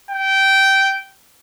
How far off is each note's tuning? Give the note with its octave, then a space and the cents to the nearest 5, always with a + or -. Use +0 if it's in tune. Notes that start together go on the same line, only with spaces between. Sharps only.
G5 -15